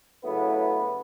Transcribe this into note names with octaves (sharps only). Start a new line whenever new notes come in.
C#3 F#3 A3 B3 E4 B4